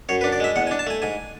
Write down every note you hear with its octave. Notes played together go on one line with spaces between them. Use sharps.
F#2 C#5
B4
D4
D5
G#3 E5
E2 F#5
G#5
D4
A5
A3 G#5
G#2 G#5